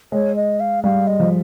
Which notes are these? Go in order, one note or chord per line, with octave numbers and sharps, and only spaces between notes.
G#3 C#5
D#5
F5
G3 F5
D#5
F3